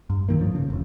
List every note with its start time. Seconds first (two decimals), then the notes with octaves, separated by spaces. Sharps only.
0.10 G2
0.29 B1 G2 D#3 A#3
0.41 A2 F3 C#4
0.55 C#3
0.70 F1